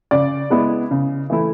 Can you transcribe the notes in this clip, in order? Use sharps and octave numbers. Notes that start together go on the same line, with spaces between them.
C#3 D5
G#3 B3 E4
C#3
E3 A3 E4